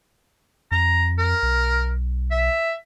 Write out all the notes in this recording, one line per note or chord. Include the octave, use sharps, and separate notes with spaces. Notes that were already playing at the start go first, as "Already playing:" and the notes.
F2 A#5
A#4
B1
E5